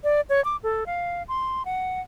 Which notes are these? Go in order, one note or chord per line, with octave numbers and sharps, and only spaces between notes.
D5
C#5
D6
A4
F5
C6
F#5